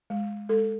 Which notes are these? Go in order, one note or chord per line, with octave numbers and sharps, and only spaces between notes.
G#3
G#3 A4